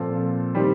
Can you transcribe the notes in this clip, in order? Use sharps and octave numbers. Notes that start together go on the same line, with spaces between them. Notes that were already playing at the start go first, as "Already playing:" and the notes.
Already playing: A#2 F3 C4 F4 A4
D#3 G3 C4 D#4 G4